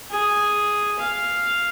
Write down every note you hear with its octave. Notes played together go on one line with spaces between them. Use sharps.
G#4
F5